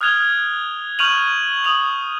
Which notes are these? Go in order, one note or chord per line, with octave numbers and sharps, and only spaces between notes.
D#6 F6 F#6 G#6 F7 G7
C#6 F6 G6 D#7 F7 F#7
D#6 F7 F#7